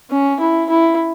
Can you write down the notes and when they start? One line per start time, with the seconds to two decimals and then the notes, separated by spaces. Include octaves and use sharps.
0.10 C#4
0.40 E4
0.70 E4